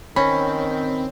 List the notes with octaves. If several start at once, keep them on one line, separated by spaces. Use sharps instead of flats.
D#3 C4 C#4 B5